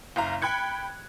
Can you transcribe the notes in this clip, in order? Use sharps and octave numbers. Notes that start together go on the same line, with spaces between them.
F#1 F5 A#5
G5 B5 F#6 G#6 C#7